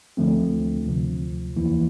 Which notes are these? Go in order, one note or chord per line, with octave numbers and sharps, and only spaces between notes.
D2 D3 F3 A3 C4
D2 C3 F3
E2 E3 A#3 E4